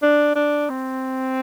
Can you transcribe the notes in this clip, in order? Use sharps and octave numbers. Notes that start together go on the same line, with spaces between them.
D4
D4
C4